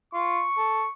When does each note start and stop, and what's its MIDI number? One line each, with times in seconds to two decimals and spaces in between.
0.14 0.44 65
0.14 0.93 85
0.57 0.84 69